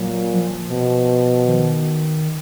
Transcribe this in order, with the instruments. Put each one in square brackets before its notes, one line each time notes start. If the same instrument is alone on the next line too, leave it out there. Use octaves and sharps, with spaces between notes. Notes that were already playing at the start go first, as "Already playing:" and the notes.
Already playing: [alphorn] A#2 [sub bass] F#3
[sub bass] F3
F3
[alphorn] B2
[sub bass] D#3